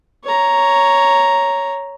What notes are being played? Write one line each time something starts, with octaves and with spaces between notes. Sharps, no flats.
C#5 A#5